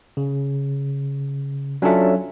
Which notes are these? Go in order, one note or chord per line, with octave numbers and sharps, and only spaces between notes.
C#3
F#3 C#4 D4 F4 A4 E5